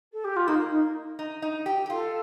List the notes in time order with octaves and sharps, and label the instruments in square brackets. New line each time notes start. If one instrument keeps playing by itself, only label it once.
[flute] A4
G4
F4
[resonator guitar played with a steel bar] A#3 [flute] D#4
[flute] D#4
[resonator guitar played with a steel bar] D#4
D#4
G4
G4
[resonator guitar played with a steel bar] F4 [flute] A4